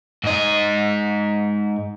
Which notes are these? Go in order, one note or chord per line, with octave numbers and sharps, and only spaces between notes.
G#2 D#5